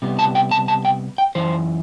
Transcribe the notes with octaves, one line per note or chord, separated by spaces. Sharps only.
C3 G3 B3
A5
G5
A5
A5
G5
G5
F#2 E3 C5